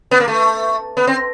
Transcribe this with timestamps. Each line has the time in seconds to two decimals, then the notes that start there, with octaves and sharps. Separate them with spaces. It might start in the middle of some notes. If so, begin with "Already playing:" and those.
0.11 B3
0.20 A#3
0.28 A3
0.97 B3
1.07 C4